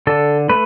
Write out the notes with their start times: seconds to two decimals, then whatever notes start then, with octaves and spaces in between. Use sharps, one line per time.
0.07 D3 A4
0.49 A3 B4